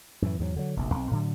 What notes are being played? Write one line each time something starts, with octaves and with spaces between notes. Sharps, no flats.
F#2 A2 E3
E2 G#2 F3 F#3
D3 F#3
F1 A#1
B1 C4
A2 D3 F#3